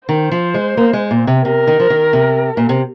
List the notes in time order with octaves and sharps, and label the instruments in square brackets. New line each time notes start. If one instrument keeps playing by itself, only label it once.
[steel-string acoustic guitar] D#3 [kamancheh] C5
[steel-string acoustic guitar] F3
G#3
A#3
G#3
A#2
C3
[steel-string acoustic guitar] C3 [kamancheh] A#4
[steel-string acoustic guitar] D#3
F3
D#3
C3
A#2
C3